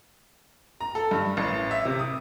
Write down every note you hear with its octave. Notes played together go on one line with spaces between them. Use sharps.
A#5
A4
G2
A1
E5
C3
D#6